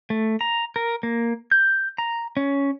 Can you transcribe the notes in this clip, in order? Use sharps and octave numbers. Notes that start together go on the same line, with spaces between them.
A3
A#5
A#4
A#3
G6
A#5
C#4